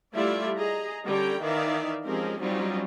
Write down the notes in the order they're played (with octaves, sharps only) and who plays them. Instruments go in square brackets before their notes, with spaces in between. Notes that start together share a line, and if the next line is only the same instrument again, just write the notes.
[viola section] G3 A3 E4 F4 D5 E5
G#4 D#5 A#5
D3 G3 C#4 C#5 G5 A#5
D#3 E3 D#4 D5 E5 F5
F3 G#3 C4 C#4 G4 A#4
F#3 G3 C4 C#4 D#4 F4